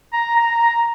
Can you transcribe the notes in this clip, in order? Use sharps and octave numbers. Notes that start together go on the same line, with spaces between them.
A#5
A#5
A#5